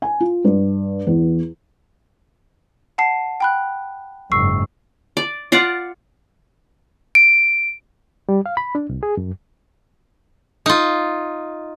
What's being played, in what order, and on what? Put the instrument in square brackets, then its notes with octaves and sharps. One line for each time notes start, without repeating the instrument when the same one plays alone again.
[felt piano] G#5
F4
G2
E2
[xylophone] F#5 A5 C7
G5 B5 F#6
[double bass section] F#1 G#2 [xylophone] C#6 E6 C7
[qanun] D5
F4 D5 F5 F#5
[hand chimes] D7
[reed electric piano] G3
F5
B5
D4
C2
G#4
F#2
[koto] D#4 F4